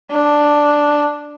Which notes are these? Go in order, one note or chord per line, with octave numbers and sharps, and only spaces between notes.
D4